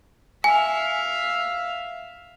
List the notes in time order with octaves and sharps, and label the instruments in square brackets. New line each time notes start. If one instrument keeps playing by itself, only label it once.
[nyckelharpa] E5 F5 [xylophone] G#5